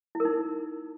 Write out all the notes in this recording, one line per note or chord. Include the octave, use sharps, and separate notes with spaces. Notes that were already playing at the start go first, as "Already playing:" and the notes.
E4
A#4
D#4